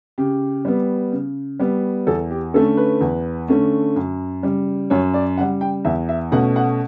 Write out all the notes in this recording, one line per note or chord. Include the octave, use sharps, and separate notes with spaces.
C#3 G4
G3 B3
C#3
G3 B3
E2 A4
G4
D3 A3 C#4 A4
B4
E2
D3 A3 C#4
F#2
C#3 G3
F#2 C#5
D5
C#3 G3 F#5
G5
E2 E5
E5
B2 A3 C#4 F#5
F#5